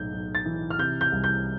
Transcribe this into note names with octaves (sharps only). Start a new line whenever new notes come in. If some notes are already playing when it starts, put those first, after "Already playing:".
Already playing: B1 A2 G6
B1
A6
E3
F6
C3 G6
G6
C2
G6